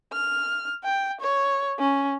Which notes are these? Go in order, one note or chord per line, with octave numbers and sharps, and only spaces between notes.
F6
G5
C#5
C#4